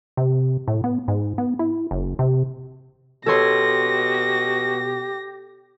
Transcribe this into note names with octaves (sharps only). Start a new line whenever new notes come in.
C3
A2
B3
G#2
B3
E4
F#1
C3
B2 G4 A4 C#5 C6 A#6